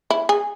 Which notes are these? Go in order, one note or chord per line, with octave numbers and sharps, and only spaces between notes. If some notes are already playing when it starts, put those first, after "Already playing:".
E4
G#4